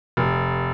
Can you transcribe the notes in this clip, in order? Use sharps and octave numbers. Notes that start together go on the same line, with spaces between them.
F1